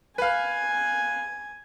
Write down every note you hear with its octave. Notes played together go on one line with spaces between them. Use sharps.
B4 F5 G#5